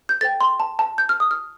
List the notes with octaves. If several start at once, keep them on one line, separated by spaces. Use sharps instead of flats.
G6
A4 C5 G5 A6
C6
A5
A5
G6
F6
D#6
F6